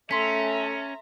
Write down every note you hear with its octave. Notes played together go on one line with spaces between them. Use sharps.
A3 C#4 E5 A#5 C6 B6